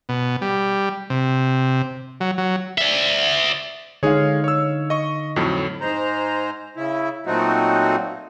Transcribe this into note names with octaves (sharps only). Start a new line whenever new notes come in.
B2
G3
C3
F#3
F#3
D5 E5
D3 G#3 D#4 G#4 C#5 F5
C#5 E6
D#5 C#6
F2 A2 F#3
G#2 G#3 C5 A#5
C#3 E4
A#2 F#3 A3 C4 D#4 F#4